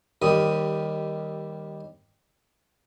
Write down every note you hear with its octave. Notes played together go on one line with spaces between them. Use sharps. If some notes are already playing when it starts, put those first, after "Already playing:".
D#2 D#3 G3 D#6